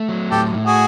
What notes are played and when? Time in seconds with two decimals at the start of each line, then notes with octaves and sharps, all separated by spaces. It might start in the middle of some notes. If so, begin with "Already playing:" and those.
Already playing: A3
0.08 F#3
0.31 A2 G4 A4
0.54 A2
0.65 F#4 G#4